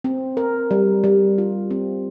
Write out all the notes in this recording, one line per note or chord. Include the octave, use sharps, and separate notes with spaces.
C4
A#4
G3
G3
F4
C4